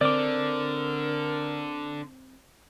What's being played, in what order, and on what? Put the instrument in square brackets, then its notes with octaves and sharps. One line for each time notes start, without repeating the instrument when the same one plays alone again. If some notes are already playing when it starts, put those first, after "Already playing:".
[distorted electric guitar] D3 [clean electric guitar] C4 [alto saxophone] A#4 [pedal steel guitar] D5 D6